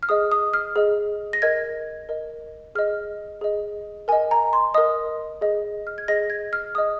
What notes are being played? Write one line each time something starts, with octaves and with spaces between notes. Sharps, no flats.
F6
G#4 D#5 D#6
D#6
F6
G#4 D#5
A#6
A#4 D#5 G#6
A#4 D#5
G#4 D#5 F6
G#4 D#5
A#4 D#5 G#5
A#5
C6
A#4 D#5 D#6
G#4 D#5
F6
G#6
G#4 D#5 A#6
G#6
F6
G#4 D#5 D#6